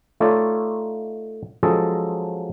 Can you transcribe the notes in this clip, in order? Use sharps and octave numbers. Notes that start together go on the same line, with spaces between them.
A3 D#4 F4 A4 C#5 D5
F3 F#3 G#3 C#4 A4 D#5